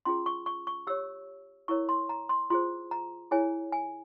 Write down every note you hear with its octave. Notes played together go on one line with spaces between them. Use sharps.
C#4 F4 G#4 C6
C#6
C#6
C#6
G4 C#5 E6
E4 A#4 C#5 C#6
C6
A#5
C6
F4 G#4 C5 C6
A#5
E4 G#4 C#5 G#5
G#5